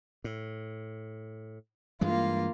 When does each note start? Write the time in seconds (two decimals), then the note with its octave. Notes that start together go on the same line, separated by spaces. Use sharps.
0.24 A2
2.01 G2 E3 G#3 A#3 F4